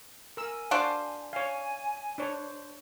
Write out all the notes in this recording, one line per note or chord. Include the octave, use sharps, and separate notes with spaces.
A#4 G#5 E6
D4 F#4 C5 F5 A5 D6
C#5 F5 G#5
D4 C5 C#5